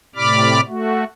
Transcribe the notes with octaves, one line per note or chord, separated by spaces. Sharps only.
A2 C3 D5 B5 D6 F6
A3 F#4